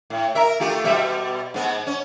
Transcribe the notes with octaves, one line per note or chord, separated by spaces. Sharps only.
A2
A#4 E5
A3 F4 G4
B2 G3 E5
G#2 B3
C#4